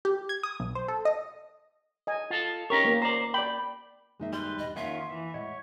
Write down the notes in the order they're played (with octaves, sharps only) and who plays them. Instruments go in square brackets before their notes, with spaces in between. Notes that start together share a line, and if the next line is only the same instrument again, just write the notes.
[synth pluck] G4
G#6
D#6
B1
C5
A4
D#5
[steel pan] D#5 G#5
[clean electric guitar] F4 A4
[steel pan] C#4 A#4 [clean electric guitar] D#4 G4 C#5
[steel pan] A#3 B3
[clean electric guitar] C5 D5 [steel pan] A#5
[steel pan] D5 G5 [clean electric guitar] B5
[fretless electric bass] F#2 D#3 A#3 [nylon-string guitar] G#3 D#4 E5
[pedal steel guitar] G3 B4 [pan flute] C6
[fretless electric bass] E2 G2 B2 [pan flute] D#5
[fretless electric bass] F2 A#3 [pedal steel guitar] D#3 C#4 F4 [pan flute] E5 [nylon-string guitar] F#5
[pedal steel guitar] E3
[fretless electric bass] A2 G#3 [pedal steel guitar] C#5 [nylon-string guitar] D#5 F#5